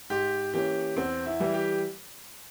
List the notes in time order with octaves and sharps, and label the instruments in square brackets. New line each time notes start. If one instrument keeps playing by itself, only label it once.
[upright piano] G#2 [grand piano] G4
[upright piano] E3 A#3 C#4 [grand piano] G4
[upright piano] E2 [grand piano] C4
[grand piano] E4
[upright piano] E3 G3
[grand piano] G4